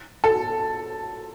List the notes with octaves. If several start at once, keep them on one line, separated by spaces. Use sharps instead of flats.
A4